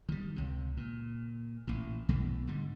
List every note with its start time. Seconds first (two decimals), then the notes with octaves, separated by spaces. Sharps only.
0.09 D#3 G3
0.36 C#2 C3
0.77 A#2
1.67 A1 A#2
2.09 B1 B2 E3 A3
2.47 G#2 D3 G3